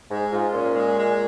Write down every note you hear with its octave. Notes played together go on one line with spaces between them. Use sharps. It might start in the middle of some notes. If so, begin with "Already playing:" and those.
G#2 G#3
G#2 F4
A#2 C#4
G#3
G#3